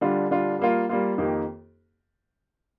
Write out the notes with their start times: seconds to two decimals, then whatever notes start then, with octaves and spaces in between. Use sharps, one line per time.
0.01 D3 G3 D4 F4
0.31 D3 G3 D4 F4
0.59 G3 A#3 F4
0.89 G3 A#3 F4
1.18 F2 D#3 A#3 D#4 G4